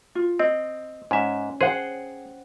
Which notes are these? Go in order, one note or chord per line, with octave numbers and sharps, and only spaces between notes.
F4
C4 D#5
G#2 C#4 C#5 E5 G#5
G#4 C5 F#5 G5